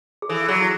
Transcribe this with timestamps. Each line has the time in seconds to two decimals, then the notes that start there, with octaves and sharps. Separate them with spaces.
0.22 G#4
0.29 E3 A4
0.48 F#3 G#4
0.61 E4